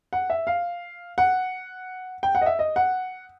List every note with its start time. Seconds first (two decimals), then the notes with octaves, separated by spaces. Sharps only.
0.13 F#5
0.30 E5
0.47 F5
1.18 F#5
2.23 G5
2.35 F#5
2.41 D#5
2.46 E5
2.59 D#5
2.76 F#5